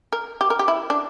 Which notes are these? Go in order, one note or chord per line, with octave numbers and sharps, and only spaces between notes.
A#4
G4
A#4
G4
E4
D4